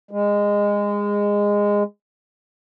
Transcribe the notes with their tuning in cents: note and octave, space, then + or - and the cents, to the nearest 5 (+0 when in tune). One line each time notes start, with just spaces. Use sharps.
G#3 -20